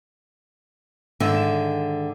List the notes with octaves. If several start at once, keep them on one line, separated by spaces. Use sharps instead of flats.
G#2 D3 D#3 E5